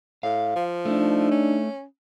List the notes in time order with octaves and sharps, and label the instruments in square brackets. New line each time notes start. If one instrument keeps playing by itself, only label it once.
[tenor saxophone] A2 [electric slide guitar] F5
[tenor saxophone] F3
[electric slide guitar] A3 [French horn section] D4 D#4
[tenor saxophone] C#4